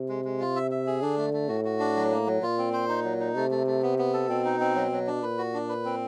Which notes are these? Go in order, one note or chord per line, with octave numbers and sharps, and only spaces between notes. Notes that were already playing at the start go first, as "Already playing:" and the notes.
Already playing: C3
G#3
G#3
F4
E5
E5
G#4
D3 D4
A3
A3
A2 F#4
F#4
D4
F#3
A#3
F#3
A#2 F4
C4
C5
D#4
F#3
D#4
C3 A3
A3
A3
B3
B3
A4
B2 C4
D#4
C4
F#3
F#3
D4
A#2 B4
F#4
D4
B4
C4